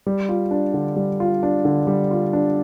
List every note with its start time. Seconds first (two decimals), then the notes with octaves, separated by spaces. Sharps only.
0.06 G3
0.29 F4
0.51 D4
0.74 D3
0.96 G3
1.20 F4
1.43 D4
1.65 D3
1.87 G3
2.11 F4
2.33 D4